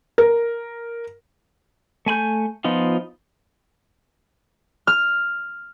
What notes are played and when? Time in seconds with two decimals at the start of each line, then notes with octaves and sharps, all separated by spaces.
0.18 A#4
2.06 A3 G#5 B5 G6
2.64 F3 B3 D#4 F4
4.87 F6